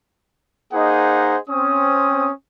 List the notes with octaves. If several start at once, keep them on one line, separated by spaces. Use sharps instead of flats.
A#3 D#4 G#4 C5 D#5 F#5
C4 C#4 D#6